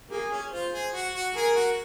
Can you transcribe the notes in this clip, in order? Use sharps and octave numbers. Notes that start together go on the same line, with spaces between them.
A#3 G#4
C#4
F4 C5
G#4
F#4
F#4
G#4 A#4
F#4